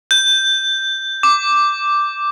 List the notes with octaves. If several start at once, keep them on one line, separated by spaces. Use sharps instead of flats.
G6
D6